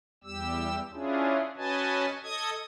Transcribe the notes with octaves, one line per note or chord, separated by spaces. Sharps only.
E2 G3 G4 E6
C#4 D4 E4 F4 G#4
C#4 F#4 B4 D#5 G#5 A5
A4 D#5 D#6 G#6